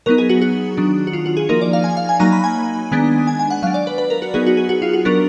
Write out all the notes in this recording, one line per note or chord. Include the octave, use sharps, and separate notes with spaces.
F#3 B3 D#4 A#4
G#4
F#4
F#4
D#3 F#3 D4
F#4
F4
F#4
G#4
F3 A#3 D#4 A#4
D5
F5
G#5
F5
G#5
F#3 A#3 D#4 A#5
B5
G#5
D#3 G#3 B3 D4
G#5
G#5
F#5
F#3 D4 F5
D5
B4
B4
A#4
F#4
F#3 B3 D#4 G#4
F#4
G#4
F#4
F4
F#4
F#3 B3 D4 A#4